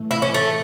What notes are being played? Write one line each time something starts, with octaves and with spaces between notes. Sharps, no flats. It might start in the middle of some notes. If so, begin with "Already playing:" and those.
Already playing: A2 E3 A3
E4
C#4
A3